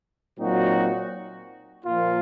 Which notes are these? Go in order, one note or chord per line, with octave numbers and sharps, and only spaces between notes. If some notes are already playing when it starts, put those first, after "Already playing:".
A#2 F#3 C4 D#4 F#4
A#2 F3 A#3 F4